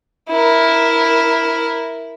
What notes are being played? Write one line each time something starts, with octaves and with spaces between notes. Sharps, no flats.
E4 A#4